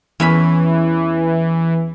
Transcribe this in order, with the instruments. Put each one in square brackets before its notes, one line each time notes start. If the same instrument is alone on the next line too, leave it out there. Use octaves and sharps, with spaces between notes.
[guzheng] E2 C#4 B5 [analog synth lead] E3